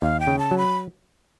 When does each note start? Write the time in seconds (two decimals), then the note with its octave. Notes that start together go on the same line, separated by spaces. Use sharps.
0.02 D#2 F5
0.20 G5
0.27 C#3
0.39 A5
0.51 F#3
0.58 B5